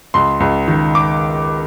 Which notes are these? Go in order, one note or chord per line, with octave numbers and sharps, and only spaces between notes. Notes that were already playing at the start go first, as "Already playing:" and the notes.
C#2 C6
C#2
D#3
D6